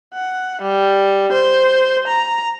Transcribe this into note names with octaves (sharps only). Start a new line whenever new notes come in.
F#5
G3
C5
A#5